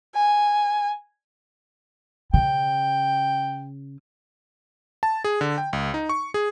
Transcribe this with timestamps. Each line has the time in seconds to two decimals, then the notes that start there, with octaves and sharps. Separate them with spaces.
0.15 G#5
2.34 C#3 G5
5.03 A5
5.24 G#4
5.41 D3
5.58 G5
5.73 C#2
5.94 D#4
6.09 C#6
6.34 G#4